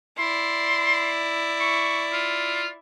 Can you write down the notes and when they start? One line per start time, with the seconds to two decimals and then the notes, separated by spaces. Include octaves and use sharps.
0.18 E4 D5 C6
1.60 C#6
2.13 F4